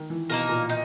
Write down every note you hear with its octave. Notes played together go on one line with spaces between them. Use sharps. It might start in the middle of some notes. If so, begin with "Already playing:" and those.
Already playing: D#3
E3
B2 A#3 D#4 A#4
A#2
D#4